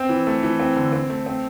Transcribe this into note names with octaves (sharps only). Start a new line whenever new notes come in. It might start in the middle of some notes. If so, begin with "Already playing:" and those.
Already playing: C4
E3
A3
E3
C4
D3
C4
A3
C4